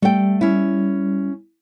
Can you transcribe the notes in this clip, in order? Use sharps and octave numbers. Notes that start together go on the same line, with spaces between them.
G3 A3 G5
C#4 E4